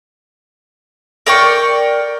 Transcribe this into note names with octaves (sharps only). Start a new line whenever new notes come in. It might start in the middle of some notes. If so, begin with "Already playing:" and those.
A#4 D5 G5 C#6